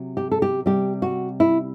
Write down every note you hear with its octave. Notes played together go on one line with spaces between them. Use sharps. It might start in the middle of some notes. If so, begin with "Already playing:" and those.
Already playing: C3 F#3
G4
A4
G4
C3 G3 G4
F#4
E4